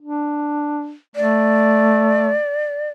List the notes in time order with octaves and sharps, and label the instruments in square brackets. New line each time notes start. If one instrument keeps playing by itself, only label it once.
[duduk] D4
[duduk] A3 [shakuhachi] D5